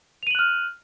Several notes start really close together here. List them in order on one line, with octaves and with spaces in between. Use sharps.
F7 D#7 F#7 F#6 F6